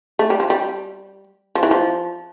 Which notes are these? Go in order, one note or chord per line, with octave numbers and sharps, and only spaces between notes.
A3
G3
F3
G3
F3
E3
F3